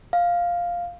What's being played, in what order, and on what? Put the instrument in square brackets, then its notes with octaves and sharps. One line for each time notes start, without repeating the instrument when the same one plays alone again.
[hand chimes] F5